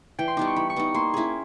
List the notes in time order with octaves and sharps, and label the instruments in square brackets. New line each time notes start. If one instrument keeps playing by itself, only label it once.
[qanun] E3 [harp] G5
[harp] C6
[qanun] G3 B3 D#4 [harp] D6
[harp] C#6
[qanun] E3 [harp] B5
[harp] C#6
[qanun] G3 B3 D#4
[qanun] A#3 [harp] C6
[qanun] C#4 E4 G#4